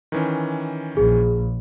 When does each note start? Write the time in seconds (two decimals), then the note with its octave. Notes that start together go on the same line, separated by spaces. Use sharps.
0.12 D#3 E3 C#4
0.97 A#1 G#4